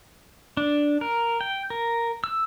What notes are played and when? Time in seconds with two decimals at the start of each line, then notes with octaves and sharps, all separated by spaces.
0.57 D4
1.01 A#4
1.41 G5
1.70 A#4
2.24 E6